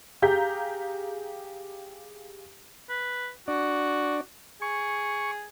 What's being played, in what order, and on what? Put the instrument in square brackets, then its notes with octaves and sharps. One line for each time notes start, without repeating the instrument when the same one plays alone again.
[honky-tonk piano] G4 G#4 F5 A#5 G6 B6
[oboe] B4
[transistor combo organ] D4 D5 [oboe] F#4
[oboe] G#4 [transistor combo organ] C#6